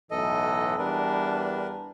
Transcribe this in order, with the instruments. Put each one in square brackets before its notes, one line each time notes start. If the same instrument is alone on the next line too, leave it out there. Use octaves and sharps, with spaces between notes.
[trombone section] B1 A2 E3 [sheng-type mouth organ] A4 D#5
[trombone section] E2 G3 D4 [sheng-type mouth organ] A#4 B4